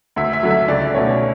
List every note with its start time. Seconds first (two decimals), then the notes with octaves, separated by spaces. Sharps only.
0.16 D2 E5
0.33 E5
0.43 D3 F#3
0.50 E5
0.68 C#2 D5
0.94 B2 A3 C#4 C#5